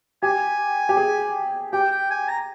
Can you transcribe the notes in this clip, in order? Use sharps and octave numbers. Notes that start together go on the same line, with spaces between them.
G4 G#5
G4
G#4
G4 G5
G5
G#5
A#5